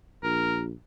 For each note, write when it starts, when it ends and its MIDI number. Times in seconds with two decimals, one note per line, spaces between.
0.23 0.73 34
0.23 0.61 70